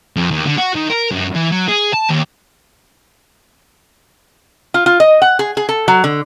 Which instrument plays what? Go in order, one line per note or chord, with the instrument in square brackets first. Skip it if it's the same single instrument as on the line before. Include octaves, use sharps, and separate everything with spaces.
[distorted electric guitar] F2
D#2
D3
F#4
D#3
A#4
F#2
E3
F#3
G#4
A5
D#2
[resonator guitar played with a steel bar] F4
F4
D#5
F#5
G#4
G#4
A4
F#3
D3